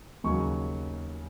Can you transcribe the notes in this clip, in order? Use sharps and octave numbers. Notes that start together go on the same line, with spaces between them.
D#2 C#3 F#3 C#6